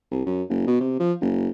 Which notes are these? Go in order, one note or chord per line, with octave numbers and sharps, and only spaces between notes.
C2
F#2
F#1
B2
C3
F3
F#1